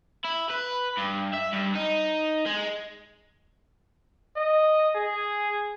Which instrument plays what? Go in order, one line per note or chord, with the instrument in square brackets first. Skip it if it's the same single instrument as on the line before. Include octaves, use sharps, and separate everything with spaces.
[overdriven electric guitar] E4
B4
G2
E5
G2
D#4
G#3
[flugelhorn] D#5
G#4